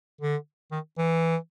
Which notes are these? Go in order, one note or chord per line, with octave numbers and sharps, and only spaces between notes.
D3
D#3
E3